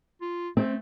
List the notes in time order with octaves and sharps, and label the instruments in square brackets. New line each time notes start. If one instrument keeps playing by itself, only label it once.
[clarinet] F4
[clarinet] A3 [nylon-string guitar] C4